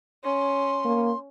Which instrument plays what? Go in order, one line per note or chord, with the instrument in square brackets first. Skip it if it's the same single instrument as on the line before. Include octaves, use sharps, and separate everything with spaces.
[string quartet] C#4 [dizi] C6
[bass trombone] A#3